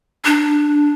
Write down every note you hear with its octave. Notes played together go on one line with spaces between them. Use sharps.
D4